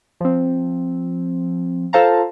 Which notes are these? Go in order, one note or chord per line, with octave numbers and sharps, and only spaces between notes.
F3 C4
F4 A4 C5 F5 A5 A#5